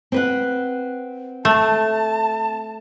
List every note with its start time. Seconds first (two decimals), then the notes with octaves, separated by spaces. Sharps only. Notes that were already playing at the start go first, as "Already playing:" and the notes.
0.12 C4 B4 F#5
1.45 A3 A5